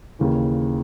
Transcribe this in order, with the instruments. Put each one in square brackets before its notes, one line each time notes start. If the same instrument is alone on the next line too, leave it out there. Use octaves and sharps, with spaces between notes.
[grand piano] D#2 C#3 E3